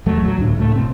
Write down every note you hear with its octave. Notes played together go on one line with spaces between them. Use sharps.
A#1 E2 F#3 A3
F#3
D2 A2 D4
C#2 A2 A3
F#1 B2 C4